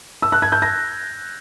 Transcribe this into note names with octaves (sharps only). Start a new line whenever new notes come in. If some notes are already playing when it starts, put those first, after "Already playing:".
E6
F#6
G#6
G6
A#6